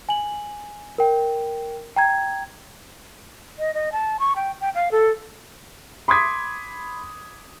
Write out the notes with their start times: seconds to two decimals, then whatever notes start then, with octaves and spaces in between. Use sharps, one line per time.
0.09 G#5 F#7
0.98 A#4 G5
1.96 G5 A#5 G#6
3.59 D#5
3.74 D#5
3.92 A5
4.20 C#6
4.36 G5
4.61 G5
4.75 F5
4.92 A4
6.08 B5 C6 D6 D#6 G#6 B6